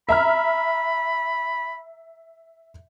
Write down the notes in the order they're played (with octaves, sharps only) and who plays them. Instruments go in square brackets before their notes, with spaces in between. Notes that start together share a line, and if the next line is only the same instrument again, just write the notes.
[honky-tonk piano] E5 A#5 F6 [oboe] B5